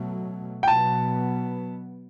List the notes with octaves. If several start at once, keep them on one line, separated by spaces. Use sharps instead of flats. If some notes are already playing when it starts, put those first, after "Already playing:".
Already playing: B2 F#3 A3
G5
B2 F#3 B3 A5